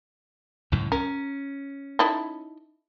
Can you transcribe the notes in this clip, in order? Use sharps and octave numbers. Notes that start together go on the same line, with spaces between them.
C#2 F#2 A2
C#4 A#4
D#4 E4 A4